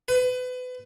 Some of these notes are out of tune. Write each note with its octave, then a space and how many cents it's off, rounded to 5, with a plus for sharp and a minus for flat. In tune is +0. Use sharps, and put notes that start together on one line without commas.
B4 +30